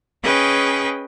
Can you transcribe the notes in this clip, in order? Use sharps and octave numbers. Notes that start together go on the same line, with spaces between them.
C#4 G#4 B4 D#5 G5